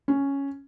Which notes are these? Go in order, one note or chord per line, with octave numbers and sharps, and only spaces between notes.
C#4